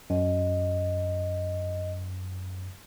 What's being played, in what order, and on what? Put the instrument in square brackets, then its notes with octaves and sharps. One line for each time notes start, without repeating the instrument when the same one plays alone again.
[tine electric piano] F#2 [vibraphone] D#5